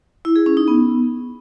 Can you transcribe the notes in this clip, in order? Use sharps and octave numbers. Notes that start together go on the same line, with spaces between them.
E4
G#4
C#4
D#4
B3